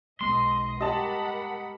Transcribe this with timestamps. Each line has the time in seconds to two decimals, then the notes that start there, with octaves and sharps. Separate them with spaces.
0.21 B1 G#3 B3 D#5 C6
0.81 G4 A#4 D#5 F#5 A5 B5